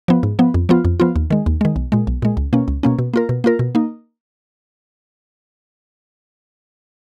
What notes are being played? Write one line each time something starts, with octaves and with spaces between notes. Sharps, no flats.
F3 B3
G#2
F3 B3
F2
F3 B3 F4
F2
F3 B3 F4
D#2
D#3 G#3
D#2
D#3 G#3
B1
A#2 G#3
B1
A#2 G#3
C#2
B2 A#3 C#4
C#2
B2 A#3 C#4
B2
A#3 F4 A#4
B2
A#3 F4 A#4
B2
A#3 D#4